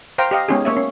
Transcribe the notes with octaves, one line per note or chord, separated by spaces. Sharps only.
C5 F5 G5 A#5
G4 D#5 F5
G#3 B3 C#4 D#4 G4 G#4
A#3 C#5 E5
C#4